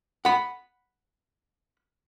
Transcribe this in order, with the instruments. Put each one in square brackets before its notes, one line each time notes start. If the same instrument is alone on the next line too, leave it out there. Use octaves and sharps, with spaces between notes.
[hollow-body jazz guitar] F#5 B5